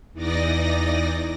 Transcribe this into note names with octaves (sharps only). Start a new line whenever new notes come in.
E2 E3 D#4 D5 D#5 A#6